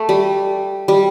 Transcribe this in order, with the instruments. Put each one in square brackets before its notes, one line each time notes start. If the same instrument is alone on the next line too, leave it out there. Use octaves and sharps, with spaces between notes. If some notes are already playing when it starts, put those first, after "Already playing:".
Already playing: [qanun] A3
G3
G3